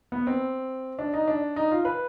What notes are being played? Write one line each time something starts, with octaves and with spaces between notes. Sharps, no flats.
B3
C4
D4
D#4
D4
D#4
F4
B4